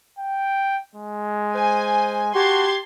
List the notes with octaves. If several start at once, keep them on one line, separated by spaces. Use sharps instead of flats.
G5
G#3
C5 G#5
F#4 G4 A5 C6 G#6